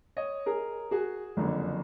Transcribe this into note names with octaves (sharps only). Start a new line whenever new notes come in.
C#5 D#5
G#4 A#4
F#4 G#4
F#1 F2 D3